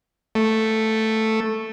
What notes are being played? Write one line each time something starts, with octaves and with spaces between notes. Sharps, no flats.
A3